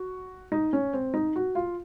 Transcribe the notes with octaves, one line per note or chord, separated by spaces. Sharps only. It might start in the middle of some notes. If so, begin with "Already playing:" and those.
Already playing: F#4
D#4
C#4
C4
D#4
F#4
F4